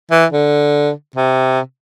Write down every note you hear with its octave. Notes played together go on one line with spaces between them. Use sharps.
E3
D3
C3